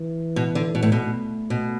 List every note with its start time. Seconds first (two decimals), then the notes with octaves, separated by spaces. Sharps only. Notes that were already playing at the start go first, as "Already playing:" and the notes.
Already playing: E3
0.36 B2
0.55 D3
0.75 B2
0.82 A2
0.92 B2 A3
1.50 B2